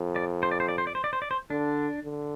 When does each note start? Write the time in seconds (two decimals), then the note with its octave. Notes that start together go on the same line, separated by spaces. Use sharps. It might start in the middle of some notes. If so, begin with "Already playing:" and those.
Already playing: F2
0.16 D5
0.43 C5
0.51 D5
0.60 C5
0.69 D5
0.78 C5
0.87 D5
0.95 C5
1.04 D5
1.13 C5
1.22 D5
1.31 C5
1.50 D3 D4
2.03 D3